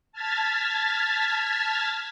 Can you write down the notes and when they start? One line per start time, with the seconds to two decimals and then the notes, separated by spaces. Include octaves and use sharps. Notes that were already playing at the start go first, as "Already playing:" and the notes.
0.12 A5 F6 G#6 A6 B6